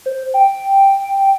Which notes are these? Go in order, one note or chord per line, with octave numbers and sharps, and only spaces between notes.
C5
G5